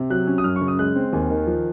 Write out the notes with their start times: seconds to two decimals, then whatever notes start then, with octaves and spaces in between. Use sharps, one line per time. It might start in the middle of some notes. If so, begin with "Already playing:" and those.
Already playing: C3
0.10 F#3 F#6
0.27 C#4
0.38 D#6
0.44 F#2 F6
0.56 C#6
0.61 C#3
0.68 D#6
0.79 G#3 F#6
0.95 C4
1.13 D#2 G#5
1.30 D#3
1.47 F3